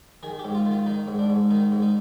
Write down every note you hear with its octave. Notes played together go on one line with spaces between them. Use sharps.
D#3 G#4
G4
G#2
F4
D#3
F4
D#3 D#4
G#2
D4
G#2
D#3 D#4
G#2
D#4